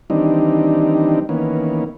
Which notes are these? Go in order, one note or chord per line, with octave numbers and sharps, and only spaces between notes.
D#3 E3 G3 C4 D4 D#4
D#3 E3 A#3 B3 C#4